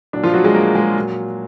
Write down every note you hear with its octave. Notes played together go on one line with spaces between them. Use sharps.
A#2 F#3 D4
F3 F4
F#3 F#4
G#3 G#4
A#3 A#4
G#3 G#4
A#2 F#3